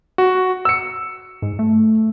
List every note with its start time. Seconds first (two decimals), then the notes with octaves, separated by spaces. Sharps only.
0.18 F#4
0.65 E6 C#7
1.42 G#2
1.59 A3